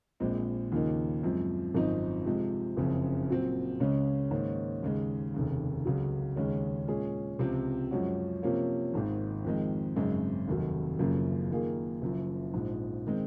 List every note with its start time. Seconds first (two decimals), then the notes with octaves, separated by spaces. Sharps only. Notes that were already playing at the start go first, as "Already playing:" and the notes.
0.20 A#1 A#2 G#3 C4
0.72 D#2 C#3 F3 A#3 D#4
1.23 F#2 F3 G#3 C4
1.74 G#1 F#2 F3 C4 D#4
2.26 C3 F3 G#3
2.77 F#1 F2 C#3 F3
3.29 A#2 F#3 C4
3.80 C#2 C#3 G#3 C#4
4.31 G#2 D#3 A#3 C#4
4.83 D#2 C#3 G#3
5.34 F1 D#2 C#3
5.85 C#2 C#3 F#3
6.36 D#2 C#3 G#3 C#4
6.88 A#2 G#3 C#4 G#4
7.39 C#2 C3 F3 C4
7.91 F#2 F3 G#3 C#4 F#4
8.42 C3 F3 A#3 C#4 F4
8.93 G#1 G#2 D#3
9.44 F2 D#3 G#3
9.96 G#1 F#2 C#3 G#3 C4
10.48 F1 D#2 D#3 F#3
10.99 F#1 F#2 C#3 F3 A#3
11.51 F#2 D#3 A#3 F4 G#4
12.02 F#1 F#2 F3
12.53 A#1 G#2 F3
13.07 D#3 G#3 C4